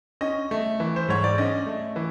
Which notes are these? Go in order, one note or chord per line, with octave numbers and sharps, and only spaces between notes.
C#4 D#5
A3
E3
C5
G#2 C#5
D5
C#4 D#5
A3
E3